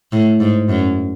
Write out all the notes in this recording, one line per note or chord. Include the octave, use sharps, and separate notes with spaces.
A2
G#2
F#2